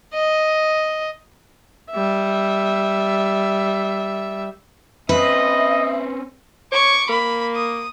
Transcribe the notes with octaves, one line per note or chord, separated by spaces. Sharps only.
D#5
G3 E5
C4 C#4 B4 D#5 E5
C#5 C#6 D6
A#3 B5
D#6